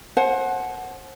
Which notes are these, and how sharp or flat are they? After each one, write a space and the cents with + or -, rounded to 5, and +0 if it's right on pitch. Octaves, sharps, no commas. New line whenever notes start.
C5 +35 F#5 +0 A5 -40